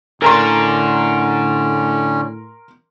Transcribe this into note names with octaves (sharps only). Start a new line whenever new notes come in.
A2 D3 C#4 D4 A#4 A#5 C6